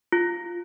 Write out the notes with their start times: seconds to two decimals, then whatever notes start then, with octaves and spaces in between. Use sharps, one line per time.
0.12 F4